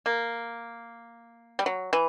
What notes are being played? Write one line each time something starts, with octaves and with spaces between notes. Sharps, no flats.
A#3
G3
F#3
E3